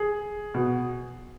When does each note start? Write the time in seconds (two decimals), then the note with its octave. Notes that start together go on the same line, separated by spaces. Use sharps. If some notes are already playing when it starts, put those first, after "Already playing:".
Already playing: G#4
0.54 B2